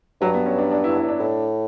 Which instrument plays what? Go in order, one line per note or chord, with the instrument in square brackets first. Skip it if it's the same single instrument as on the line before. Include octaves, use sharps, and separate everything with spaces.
[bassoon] G2 [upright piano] F#3
[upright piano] B3
C#4
D4
D4
E4
E4
D4
[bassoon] A2